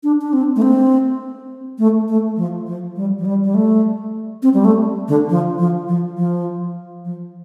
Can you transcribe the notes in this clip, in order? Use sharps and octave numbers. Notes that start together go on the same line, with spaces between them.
D4
D4
C4
A3
C4
A3
A3
F3
F3
G3
F3
G3
G3
A3
C4
G3
A3
D3
F3
F3
F3
F3
F3